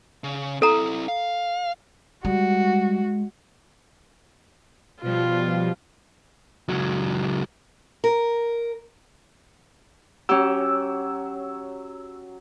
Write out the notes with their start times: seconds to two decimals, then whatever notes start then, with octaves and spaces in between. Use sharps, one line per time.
0.24 C#3
0.62 C4 E4 A4 A#5
1.08 F5
2.25 G3 G#3 F#4
5.02 B2 F3 G3 F4
6.69 C#2 F#3
8.04 A#4
10.29 F#3 C#4 G4 E6